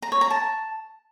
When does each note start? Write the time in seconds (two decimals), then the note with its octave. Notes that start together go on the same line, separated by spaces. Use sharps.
0.02 A#5
0.12 C#5
0.21 A#5
0.31 A5